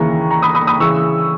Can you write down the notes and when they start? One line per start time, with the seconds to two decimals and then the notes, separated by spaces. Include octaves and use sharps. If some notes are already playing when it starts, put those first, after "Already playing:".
Already playing: D#2 C#3 E3 A#5 C#6
0.30 A#5 C#6
0.42 B5 D#6
0.55 B5 D#6
0.67 B5 D#6
0.80 C#3 E3 C#6 E6